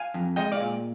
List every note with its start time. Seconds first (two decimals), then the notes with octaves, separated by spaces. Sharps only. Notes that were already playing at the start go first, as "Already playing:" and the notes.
Already playing: F5 G#5
0.14 F2
0.36 G#3 D#5 G5
0.52 D5 F5
0.60 A#2